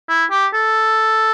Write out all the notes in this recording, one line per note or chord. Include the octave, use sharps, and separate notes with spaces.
E4
G4
A4